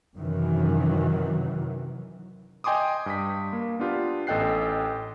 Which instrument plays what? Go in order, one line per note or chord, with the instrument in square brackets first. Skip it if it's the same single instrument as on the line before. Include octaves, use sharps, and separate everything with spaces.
[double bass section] F#2 C3 D#3 E3 F#3
[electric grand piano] D#5 G5 G#5 C6 D6 D#6
G2 D#6 B6
A#3
B3 D4 F4 G4
A1 A4 D#5 G5 F#6 C7